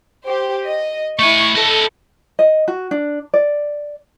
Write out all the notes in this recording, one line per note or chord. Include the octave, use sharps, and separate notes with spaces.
G4 C5
D#5
A3 E4 G#5 C#6
E4 A4 D#5
D#5
F#4
D4
D5